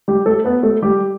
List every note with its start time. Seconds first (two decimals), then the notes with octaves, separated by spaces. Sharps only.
0.08 G3 G4
0.26 A3 A4
0.44 B3 B4
0.63 A3 A4
0.82 G3 G4